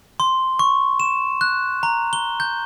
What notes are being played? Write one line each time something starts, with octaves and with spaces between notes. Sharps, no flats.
C6
C#6
E7
F#6
A#5
G7
G6